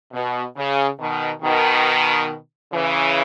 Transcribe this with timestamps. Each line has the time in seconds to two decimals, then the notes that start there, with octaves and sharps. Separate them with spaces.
0.13 B2
0.56 C#3
1.00 B2 D#3
1.42 B2 D#3
2.72 C#3 E3